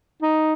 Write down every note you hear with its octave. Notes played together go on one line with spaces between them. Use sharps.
D#4